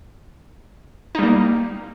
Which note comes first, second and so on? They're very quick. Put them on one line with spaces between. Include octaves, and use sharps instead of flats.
D#4 G3 A#3